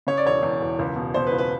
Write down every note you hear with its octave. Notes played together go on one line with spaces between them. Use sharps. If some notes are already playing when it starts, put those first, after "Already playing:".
C#3 C#5
D5
E1 C#5
E2
E1
C#2
B2
B2 C5
B4
C#2
B4